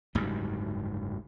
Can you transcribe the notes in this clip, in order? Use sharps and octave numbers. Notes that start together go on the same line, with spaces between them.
F#1 D2 G#2 G3